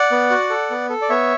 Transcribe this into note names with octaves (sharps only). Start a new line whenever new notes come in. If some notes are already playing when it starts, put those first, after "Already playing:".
Already playing: D5 F#5
B3
F#4
A4
B3
A4
D5
B3 C#5 E5